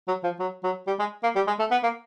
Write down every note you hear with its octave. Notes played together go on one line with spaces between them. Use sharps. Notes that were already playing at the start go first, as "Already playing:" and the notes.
F#3
F3
F#3
F#3
G3
G#3
A#3
G3
G#3
A3
B3
A#3